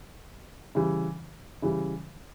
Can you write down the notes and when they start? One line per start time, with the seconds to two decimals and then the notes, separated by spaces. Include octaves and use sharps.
0.75 C#3 E3 G3
1.62 C#3 E3 G3